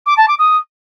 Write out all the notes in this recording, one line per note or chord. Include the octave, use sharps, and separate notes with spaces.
D6
A5
D6
D#6